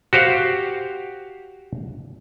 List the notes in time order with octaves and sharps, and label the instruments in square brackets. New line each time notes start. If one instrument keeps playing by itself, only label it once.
[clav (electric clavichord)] F#4 G4 C5 F5